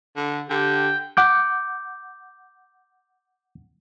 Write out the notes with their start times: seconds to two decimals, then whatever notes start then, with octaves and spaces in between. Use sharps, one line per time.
0.16 D3
0.50 D3 G4 G5
1.17 F#5 D6 G6